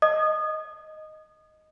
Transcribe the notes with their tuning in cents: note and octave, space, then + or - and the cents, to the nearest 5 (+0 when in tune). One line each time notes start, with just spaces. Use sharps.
D#5 -5 D#6 -25